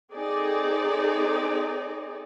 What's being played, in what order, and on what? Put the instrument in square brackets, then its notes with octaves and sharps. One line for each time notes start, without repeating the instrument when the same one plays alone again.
[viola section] C4 D#4 G#4 A4 D5